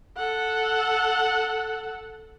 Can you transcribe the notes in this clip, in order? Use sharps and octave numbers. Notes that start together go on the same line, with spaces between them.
A4 F#5